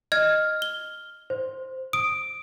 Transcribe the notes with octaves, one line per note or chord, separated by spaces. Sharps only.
D#5 F6 G#6
G7
C5
D#6 D7